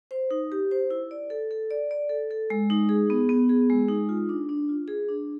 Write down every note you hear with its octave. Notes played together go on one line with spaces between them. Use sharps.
C5
D#4
G4
C5
E4
D5
A4
A4
D5
D5
A4
A4
G#3
D#4
G#4
B3
B3
G#4
G#3
D#4
F4
D4
D4
F4
G#4
D4